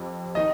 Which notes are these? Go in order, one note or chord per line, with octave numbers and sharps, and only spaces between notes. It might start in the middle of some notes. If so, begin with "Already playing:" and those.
Already playing: F2 F3 G4
D#3 D#5